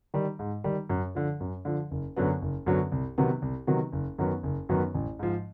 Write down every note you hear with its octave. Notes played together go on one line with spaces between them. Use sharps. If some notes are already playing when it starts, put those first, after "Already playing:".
D#3 G3
G#2
D#3 G3
F#2
D3 F3
F#2
D3 F3
F#1
F#2 D3 F#3 B3
F#1
F#2 D3 F#3 B3
C2
C3 D#3 F#3 B3
C2
C3 D#3 F#3 B3
F#1
F#2 D#3 F#3 B3
F#1
F#2 D#3 F#3 B3
A1
G#2 F3